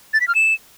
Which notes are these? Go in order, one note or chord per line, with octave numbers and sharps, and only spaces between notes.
A6
B6
F6
E7